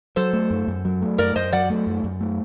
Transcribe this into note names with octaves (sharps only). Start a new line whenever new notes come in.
F#3 A4 C5
A3
F#2
F#2
F#3
A3
F#2 A#4 D5
F#2 C5 D#5
F#3 D5 F#5
A3
F#2
F#2
A3